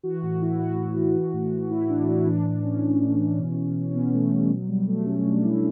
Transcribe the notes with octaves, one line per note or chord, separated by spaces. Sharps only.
E3 F#4
A2 F#4
E3 E4
A2 F#4
A2
E3
E3
A2
E3
A2 E4
A2 D4
A2 E4
E3 D4
A2 D4
E3 C#4
E3
A2
E3
B2
B2
B2
C#4
B2 B3
B2 A3
B2 G3
B2 F#3
B2 G3
B2 A3
B2 C#4
B2 D4
B2 E4